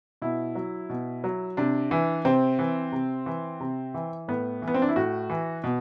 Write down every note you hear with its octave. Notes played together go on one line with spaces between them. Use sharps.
B2 E4
F#3
B2
F#3
C3 D4
E3
C3 C4
E3
C3
E3
C3
E3
A2 B3
E3
B3
C4
D4
E4
A2 F#4
E3
B2